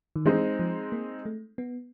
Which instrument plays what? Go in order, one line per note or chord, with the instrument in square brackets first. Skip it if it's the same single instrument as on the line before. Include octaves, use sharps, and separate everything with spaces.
[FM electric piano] D#3
[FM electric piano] E3 [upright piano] G#3 C4 D#4
[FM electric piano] F3
A#3
A3
B3